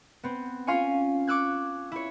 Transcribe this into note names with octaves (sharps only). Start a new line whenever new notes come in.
B3 C4
C#4 F4 F5 G#5 C6 C#6
C#6 D6 E6 F#6 G#6
E4 C#5